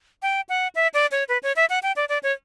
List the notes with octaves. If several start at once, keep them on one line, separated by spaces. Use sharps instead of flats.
G5
F#5
E5
D5
C#5
B4
C#5
E5
F#5
G5
D5
D5
C#5